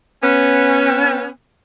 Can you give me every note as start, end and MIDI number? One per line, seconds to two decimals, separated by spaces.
0.23 1.27 59
0.23 1.27 61